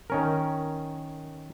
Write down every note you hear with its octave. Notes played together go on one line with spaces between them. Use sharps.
D#3 C#4 A#4